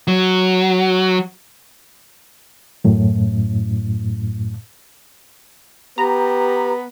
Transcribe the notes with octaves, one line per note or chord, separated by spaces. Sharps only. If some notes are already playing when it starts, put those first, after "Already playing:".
F#3
F#2 A2
B3 G4 B4 A#5